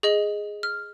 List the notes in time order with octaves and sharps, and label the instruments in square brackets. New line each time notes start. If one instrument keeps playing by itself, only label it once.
[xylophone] G#4 D#5 F#7
F6